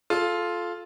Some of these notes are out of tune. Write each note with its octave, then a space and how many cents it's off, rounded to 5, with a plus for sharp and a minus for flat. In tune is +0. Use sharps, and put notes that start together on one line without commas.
F4 +0 A4 -20